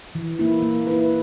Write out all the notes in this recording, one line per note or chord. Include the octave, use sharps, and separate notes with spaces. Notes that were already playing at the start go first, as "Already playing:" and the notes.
E3
A#3 E4
A#3
E4 B4